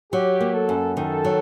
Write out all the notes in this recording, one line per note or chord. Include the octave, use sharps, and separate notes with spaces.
F#3 G4
A#3
A4
F#2
D#3 A4
F#3